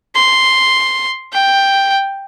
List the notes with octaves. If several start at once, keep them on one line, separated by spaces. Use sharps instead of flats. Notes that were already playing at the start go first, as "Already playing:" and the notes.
C6
G5